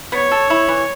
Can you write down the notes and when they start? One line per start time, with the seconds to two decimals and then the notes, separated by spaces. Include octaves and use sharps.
0.12 B3 C#5
0.32 A4
0.50 E4
0.68 E3